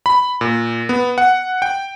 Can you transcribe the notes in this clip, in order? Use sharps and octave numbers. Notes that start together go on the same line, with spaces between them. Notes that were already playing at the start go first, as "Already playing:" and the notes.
B5
A#2
B3
F#5
G5